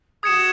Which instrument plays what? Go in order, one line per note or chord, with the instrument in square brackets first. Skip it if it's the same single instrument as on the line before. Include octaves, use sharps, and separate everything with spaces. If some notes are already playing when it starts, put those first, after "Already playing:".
[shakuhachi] F#4 G#4 [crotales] D#6 G#6 C#7 E7